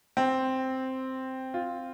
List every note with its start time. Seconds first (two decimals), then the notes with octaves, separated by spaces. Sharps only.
0.17 C4
1.54 F4